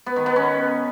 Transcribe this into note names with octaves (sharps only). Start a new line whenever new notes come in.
B3
D#3
B3
C#4